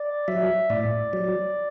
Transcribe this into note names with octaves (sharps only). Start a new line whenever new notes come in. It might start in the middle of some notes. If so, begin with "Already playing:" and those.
Already playing: D5
F#3 E5
A2 D5
F#3